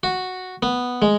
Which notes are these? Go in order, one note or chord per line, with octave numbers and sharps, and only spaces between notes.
F#4
B3
G#3